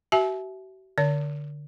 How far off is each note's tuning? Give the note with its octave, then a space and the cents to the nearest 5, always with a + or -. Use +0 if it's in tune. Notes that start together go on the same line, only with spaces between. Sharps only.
F#4 +45 E5 +0 G#5 +45
D3 +0 D5 -45